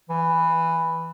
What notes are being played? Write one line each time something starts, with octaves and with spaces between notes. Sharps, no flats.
E3